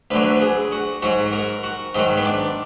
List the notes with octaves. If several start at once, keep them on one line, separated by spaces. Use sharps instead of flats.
D2 D3 F#3 B4
G#4
F#4
G#2 F#3 F#4
A#4
F#4
G#2 D#3 F#3 D#4
B3
D4